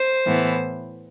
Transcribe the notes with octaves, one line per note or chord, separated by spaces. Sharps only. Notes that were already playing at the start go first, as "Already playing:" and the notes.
Already playing: C5
A2 E3 B3